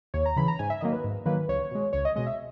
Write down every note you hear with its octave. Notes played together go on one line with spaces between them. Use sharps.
D#2 C#5
A#5
C#3 E3 B5
A#5
G#2 G#5
E5
D#3 F#3 A#3 D#5
B4
G#2
D#3 F#3 A#3 B4
C#2 C#5
B2 G#3
C#2 C#5
D#5
B2 G#3 D#5
E5